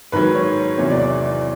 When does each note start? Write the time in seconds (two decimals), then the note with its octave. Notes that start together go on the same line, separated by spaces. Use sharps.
0.12 G#2 D#3 F#3 B4
0.35 C#5
0.78 E2 C3 D#3 F#3 C#5
0.90 D5
1.00 D5